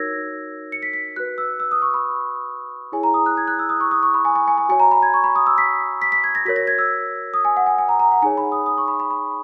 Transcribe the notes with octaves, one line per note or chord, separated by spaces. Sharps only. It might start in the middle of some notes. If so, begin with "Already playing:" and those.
Already playing: D#4 F#4 A#4 C#5 E6 G#6 A#6
C#7
B6
B6
F#4 B4 F#6
E6
E6
D#6
C#6
B5
E4 G#4 C#5 G#5
A#5
D#6
F#6
G#6
F#6
E6
D#6
C#6
D#6
C#6
B5
G#5
G#5
G#5
G#5
F#4 C#5 G#5
A#5
B5
G#6
C#6
B5
D#6
E6
B6
B6
B6
G#6
A#6
F#4 A#4 C#5 B6
A#6
G#6
E6
D#6
G#5
F#5
G#5
G#5
A#5
A#5
F#5
D#4 G#4 C#5 G#5
B5
D#6
D#6
C#6
B5
B5
B5